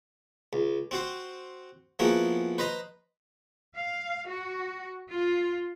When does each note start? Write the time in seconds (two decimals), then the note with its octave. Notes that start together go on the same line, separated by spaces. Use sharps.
0.53 C#2
0.91 C4 F#4 C5
1.99 F3 A#3 B3 E4 F#4 G#4
2.58 B4 C5 D#5 A#5
3.75 F5
4.28 F#4
5.11 F4